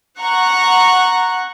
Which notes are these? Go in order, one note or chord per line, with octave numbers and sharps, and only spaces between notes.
F#5 A#5 C#6 F#6